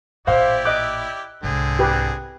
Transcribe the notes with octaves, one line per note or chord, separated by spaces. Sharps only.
A1 A#2 E4 G4 C5 D5 F5
D#5 D6 F#6
C2 G#2 D3 C4 G#4
G4 B4